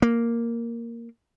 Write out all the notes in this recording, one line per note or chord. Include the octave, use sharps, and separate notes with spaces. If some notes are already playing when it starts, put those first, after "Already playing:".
A#3